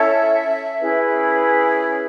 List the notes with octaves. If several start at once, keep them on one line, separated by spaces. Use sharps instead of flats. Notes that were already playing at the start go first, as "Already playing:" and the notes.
Already playing: C#4 E4 A4 C#5 E5
C#4 E4 G#4 B4